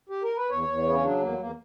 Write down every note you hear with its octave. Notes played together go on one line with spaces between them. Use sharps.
G4
A#4
B4
E2 C#5
E2
C#3 B3
C#4
F#3 D4
E2 A#3
G3
E2 A#3